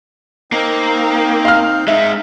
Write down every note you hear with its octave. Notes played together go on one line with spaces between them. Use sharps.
A#3 C4 D#4
F5 F6
G#3 D#4 E5